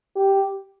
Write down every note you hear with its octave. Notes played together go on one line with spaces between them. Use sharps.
G4